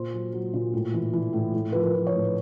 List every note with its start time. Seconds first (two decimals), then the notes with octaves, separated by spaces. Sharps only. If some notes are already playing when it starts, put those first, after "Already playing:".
Already playing: A#2 C5
0.13 F#3
0.33 F#3
0.54 A#2
0.74 A2
0.94 E3
1.13 E3
1.33 A2
1.54 A2
1.72 F3 B4
1.81 A#4
1.94 F3
2.07 C#5
2.14 A2
2.24 B4